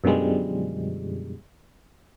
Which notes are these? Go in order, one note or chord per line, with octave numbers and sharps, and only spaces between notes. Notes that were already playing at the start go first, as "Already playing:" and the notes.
F#2 B2 D3 F3 G3 G#3